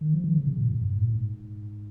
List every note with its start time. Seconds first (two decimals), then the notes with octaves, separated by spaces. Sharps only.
0.01 D#3
0.13 F3
0.24 D#3
0.35 C#3
0.47 C3
0.58 A#2
0.71 G2
0.82 G2
0.93 G#2
1.01 A#2
1.10 G#2